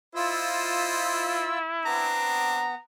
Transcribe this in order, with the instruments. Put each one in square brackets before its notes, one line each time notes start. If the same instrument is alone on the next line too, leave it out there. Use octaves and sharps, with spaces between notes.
[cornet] E4 [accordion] F4 E6 [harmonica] C5 D#5
[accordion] B3 [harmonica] C4 D4 [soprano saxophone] A#5